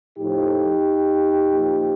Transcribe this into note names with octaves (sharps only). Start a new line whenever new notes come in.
A2 F3 D#4 G4
A#2 F3